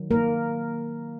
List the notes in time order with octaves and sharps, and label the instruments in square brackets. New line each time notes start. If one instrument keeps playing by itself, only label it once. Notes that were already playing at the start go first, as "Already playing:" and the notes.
Already playing: [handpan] D#3 F#3
A#3 A#4